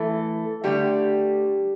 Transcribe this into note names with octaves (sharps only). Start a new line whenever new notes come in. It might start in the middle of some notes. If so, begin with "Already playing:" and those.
Already playing: E3 A3 A4
D3 G3 A3 G4